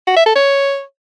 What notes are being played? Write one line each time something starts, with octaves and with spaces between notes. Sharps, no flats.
F#4
E5
A4
C#5